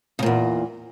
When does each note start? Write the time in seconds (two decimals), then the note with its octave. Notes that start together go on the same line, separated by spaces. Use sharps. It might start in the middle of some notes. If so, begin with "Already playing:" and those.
0.19 C#3
0.23 A#2
0.26 E2